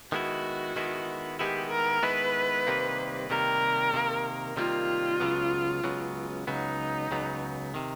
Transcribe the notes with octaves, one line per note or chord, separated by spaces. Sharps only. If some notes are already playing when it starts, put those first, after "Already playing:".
D#3 G#3 B3 E4 F#4
D#3 G#3 B3 E4
D#3 G#3 B3 E4 G4
A#4
D#3 G#3 B3 E4 B4
C3 D#3 G3 A#3
C3 D#3 G3 A#3 A#4
C3 D#3 G3 A#3
C3 D#3 G3 A#3 F4
C#2 C#3 F#3 B3
C#2 C#3 F#3 B3
C#2 C#3 F#3 B3 D#4
C#2 C#3 F#3 B3
C3 D#3